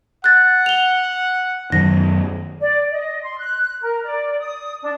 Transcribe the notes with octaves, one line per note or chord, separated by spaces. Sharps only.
F#5 F#6 A6
F7 G7
F#2 D#3 A#6
D5
D#5
C6
F#6
A#4
D5
D#6
D4